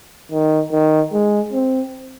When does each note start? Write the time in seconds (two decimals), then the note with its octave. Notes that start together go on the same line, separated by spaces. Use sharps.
0.32 D#3
0.72 D#3
1.13 G#3
1.53 C4